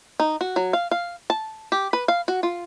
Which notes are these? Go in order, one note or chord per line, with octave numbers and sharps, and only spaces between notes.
D#4
F#4
F#3
F5
F5
A5
G4
B4
F5
F#4
F4